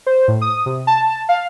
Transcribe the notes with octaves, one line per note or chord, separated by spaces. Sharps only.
C5
A2
D#6
C3
A5
F5